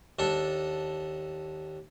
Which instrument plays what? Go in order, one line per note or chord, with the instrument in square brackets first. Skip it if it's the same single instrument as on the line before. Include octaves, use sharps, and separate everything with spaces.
[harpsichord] D#2 D4 A4